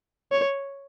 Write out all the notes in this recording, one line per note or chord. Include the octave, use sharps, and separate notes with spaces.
C#5